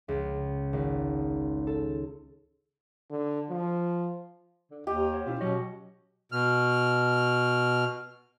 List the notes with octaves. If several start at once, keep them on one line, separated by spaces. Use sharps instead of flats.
C#2
G#1
A4
D3
F3
D3
D#2 G4 D#5
C5 C#5 F#5
B2 C#4 E4 F4
B2 F#3 C#4 F#4 D#5
B2 F6